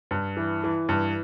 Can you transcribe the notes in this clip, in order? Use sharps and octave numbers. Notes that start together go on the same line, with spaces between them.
G2
E3
E3
G2